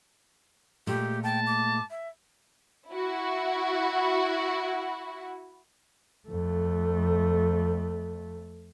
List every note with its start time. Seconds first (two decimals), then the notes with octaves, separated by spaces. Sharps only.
0.87 A#2 G#3 A3 G4
1.23 G5 A5
1.47 D6
1.90 E5
2.90 E4 F#4
6.28 F2 A3